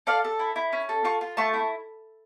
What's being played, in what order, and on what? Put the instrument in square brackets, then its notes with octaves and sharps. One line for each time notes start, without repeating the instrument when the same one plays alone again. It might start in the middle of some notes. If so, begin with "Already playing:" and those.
[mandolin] A4 D5 F5
A4
E4
E4
C#4
A4
F4 A5 C#6
F4
A3 A5 C#6
E4